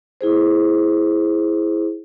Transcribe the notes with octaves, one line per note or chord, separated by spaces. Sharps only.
E4 G#4 C5